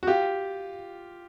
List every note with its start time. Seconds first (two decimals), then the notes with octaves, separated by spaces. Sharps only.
0.03 F#4
0.07 F4 G4